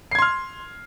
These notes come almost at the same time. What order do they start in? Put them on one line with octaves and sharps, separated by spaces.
C7 G#6 C6 F6